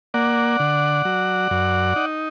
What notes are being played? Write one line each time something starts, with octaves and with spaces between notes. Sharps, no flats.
A#3 D5 F#5
D3
F#3
F#2
D#4